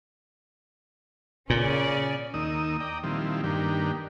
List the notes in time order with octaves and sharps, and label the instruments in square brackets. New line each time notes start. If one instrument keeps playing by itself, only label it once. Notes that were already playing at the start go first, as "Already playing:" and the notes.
[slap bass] A#2 [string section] C#3 C#4 D5
[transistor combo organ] D#2 A#3 D#4 D#6 E6
D5 D#5 G5 A#5
A#2 D#3 F3 G3 C4 E4
G2 D#3 A#3 D4 G4